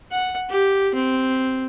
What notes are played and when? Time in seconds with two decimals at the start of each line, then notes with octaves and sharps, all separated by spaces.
0.12 F#5
0.49 G4
0.95 C4